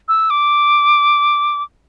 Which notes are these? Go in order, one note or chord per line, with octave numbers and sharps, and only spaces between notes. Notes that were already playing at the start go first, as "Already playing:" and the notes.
E6
D6